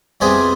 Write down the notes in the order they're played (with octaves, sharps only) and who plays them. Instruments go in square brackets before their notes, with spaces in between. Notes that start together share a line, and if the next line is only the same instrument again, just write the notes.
[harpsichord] F2 C3 G3 B3 G#4 C5